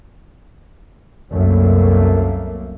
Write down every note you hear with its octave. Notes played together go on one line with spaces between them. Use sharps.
C2 F#2 A3 A#3